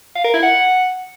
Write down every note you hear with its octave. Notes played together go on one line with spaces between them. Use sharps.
F5
A#4
E4
F#5